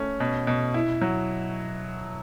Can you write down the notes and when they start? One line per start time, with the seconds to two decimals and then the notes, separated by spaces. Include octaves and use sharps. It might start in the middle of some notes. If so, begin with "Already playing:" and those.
Already playing: A3 C#4
0.20 B2
0.47 B2
0.74 E4
1.02 F#3